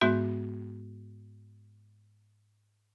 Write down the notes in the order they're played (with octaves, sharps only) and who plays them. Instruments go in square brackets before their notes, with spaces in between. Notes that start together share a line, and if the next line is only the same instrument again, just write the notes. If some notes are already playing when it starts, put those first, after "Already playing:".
[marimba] G#2 G#3 B3 F#4 E5 G6